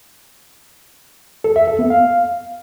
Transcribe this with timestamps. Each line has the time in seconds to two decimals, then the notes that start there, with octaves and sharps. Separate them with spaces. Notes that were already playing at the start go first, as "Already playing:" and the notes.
1.44 A4
1.56 E5
1.67 A4
1.79 B3
1.90 F5